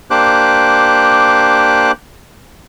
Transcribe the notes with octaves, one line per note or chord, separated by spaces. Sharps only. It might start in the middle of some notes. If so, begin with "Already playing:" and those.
A#3 D4 G4 C5 D6 F#6